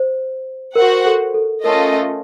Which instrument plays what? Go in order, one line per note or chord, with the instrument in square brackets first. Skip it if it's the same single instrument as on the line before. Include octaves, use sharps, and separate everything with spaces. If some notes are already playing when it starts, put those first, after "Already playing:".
Already playing: [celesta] C5
[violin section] F#4 C5 F#5 [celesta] A#4
[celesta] A4
A4
[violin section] A3 C#4 F4 A4 D#5 [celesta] A#4